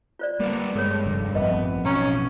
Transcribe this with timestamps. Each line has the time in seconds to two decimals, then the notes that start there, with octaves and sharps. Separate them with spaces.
0.19 F4 C5 D5
0.40 G3 A#3 B3
0.76 G2 G#3 A#4 C#5
1.06 F1 D3
1.35 A1 F2 B3 A#4 D#5 E5
1.85 B1 C#4 A#5